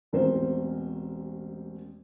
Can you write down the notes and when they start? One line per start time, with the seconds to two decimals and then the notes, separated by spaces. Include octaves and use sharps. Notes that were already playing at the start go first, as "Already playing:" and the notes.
0.13 E1 A1 C4 A#4 C5